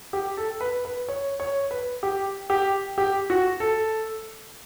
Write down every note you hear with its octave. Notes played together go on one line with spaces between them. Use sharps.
G4
A4
B4
B4
C#5
C#5
B4
G4
G4
G4
F#4
A4